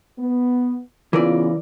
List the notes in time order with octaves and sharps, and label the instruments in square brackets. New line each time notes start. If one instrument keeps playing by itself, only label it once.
[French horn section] B3
[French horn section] C#3 B3 F4 [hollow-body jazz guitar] E3 A#4 D5